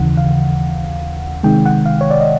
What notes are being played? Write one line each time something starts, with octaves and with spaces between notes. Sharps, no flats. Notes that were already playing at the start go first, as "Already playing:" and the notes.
Already playing: D#2 C#3 E3 F#5
F5
C3 D#3 G#3 G5
F#5
F5
C#5
D5
D#5